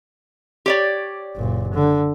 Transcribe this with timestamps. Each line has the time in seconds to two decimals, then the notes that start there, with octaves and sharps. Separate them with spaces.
0.66 G4 C#5 D5
1.37 F#1 A#2
1.74 D3